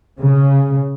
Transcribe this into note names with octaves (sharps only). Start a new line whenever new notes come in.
C#3